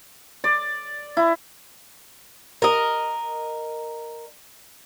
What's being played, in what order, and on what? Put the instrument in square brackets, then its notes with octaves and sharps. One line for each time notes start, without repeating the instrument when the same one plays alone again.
[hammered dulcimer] D5
E4
[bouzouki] A#4 D#5